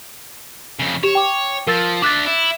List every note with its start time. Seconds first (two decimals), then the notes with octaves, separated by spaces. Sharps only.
0.79 F2 C#3
1.03 G4 C#5 E7
1.15 G5 D6
1.67 F3 A#4 E6 A6
2.02 D4 E5 D6 F#6 A6
2.27 E4